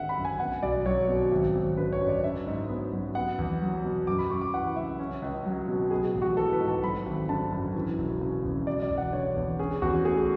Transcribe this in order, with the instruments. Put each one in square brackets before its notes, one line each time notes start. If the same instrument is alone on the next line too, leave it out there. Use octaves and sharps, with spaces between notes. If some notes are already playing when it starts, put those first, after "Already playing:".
Already playing: [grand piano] G#1 D3 E5 F#5
B5
F#2
G#5
B3 F#5
B1 D5
F#3 C#5
B2
G#1
G#1
D3 B4
C#5
F#2
D5
D4 E5
G#2
B3
F#3
B3 F#5
E2
F#3
B2
F#2 D6
B5
F#2 C#6
D6
E3 F#5
C#3 E5
C#4
C#2
F#3
B2
B3 G#4
A1
F#4
E3 A4
B4
G#2
A5
F#3 B5
G#1
D3 A5
F#2
E3
E1
C#3
E2
E1 D5
D5
E1
F#5
D3 C#5
E2
C#4 G#4
E2 F#4
A3 G#4